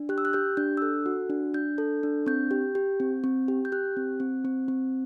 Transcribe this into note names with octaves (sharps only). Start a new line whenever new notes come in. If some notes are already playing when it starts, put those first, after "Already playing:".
Already playing: D4
G4 F#6
E6
F#6
G4 G6
D4 G6
E6
A4 F#6
F#4
D4
D4 G6
A4
D4
C4 G6
G4
G4
C4
C4
G4
G6
G4 F#6
C4
C4
C4
C4